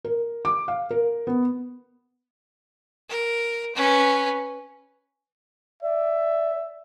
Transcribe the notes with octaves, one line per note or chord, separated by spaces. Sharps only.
A#4
D6
F5
A#4
B3
A#4
C#4 B4
D5 E5